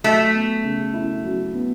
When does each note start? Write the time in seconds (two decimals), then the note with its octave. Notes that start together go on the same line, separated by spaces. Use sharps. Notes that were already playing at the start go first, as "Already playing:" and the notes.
0.04 F#3 A3
0.34 B3
0.64 C#3
0.94 E4
1.24 F#3
1.54 B3